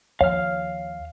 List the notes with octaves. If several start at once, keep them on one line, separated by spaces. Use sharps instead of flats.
D#2 F3 C#5 F5 F6